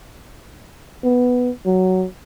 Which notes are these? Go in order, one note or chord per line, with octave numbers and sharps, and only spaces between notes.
B3
F#3